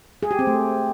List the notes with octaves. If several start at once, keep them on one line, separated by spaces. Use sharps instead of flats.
G#4
G4
C4
A3